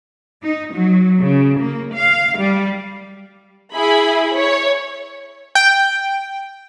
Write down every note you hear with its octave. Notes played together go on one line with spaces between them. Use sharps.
D#4
F#3
C#3
A#3
F5
G3
E4 G#4 B5
C#5
G5